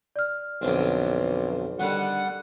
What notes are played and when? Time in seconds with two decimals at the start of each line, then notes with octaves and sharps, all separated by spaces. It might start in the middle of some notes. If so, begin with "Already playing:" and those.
0.16 D5 F6
0.62 B1 F2 D3 C4
1.80 D3 D#3 G3 F#5